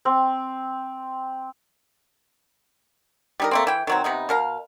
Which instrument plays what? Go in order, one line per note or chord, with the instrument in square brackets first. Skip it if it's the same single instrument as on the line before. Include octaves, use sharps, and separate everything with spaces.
[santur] C4
[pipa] G3 D#4 A#4
A3 A#3 C4
E3 G5
D#3 F#3 C4
C3 B3 D#4
B2 A#4 F5